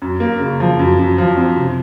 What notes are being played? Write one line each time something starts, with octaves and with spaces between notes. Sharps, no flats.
F#2
A#3
C#3
F3
F#2
F#2
F3
C4
C3